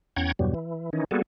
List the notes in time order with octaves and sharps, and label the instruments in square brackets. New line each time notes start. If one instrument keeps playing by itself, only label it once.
[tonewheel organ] E2 C#4 F#5 G5 A#5 G#6
E2 G2 B2 F#3 G3
E3
D#3 E3 C#4 D#4
G3 A#3 B3 F#4 G#4 A4